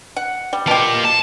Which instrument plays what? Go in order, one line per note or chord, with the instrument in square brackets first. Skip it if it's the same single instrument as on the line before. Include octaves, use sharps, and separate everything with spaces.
[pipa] F#5
G3
[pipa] B2 G4 [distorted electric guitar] A#3 F4
[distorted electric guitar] A5